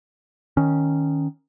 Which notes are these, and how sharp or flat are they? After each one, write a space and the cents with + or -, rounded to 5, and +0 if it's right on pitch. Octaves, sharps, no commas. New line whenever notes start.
D#3 +0 C#4 +0